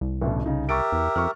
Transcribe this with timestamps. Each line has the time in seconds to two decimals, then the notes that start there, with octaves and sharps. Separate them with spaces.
0.01 C2
0.22 A1 D2 B2
0.46 C#3 D#4
0.69 G4 A#4 E5 C#6 A6 D7
0.92 E2
1.16 F2 C#6 F6